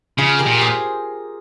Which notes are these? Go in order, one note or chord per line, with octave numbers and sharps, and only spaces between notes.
C#3 F4 G#4
G4 A#4
A#2
G#4 C5